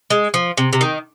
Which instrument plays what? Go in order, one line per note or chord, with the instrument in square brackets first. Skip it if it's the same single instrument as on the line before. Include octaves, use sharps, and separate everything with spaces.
[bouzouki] G#3
F3
C3
C3
D#3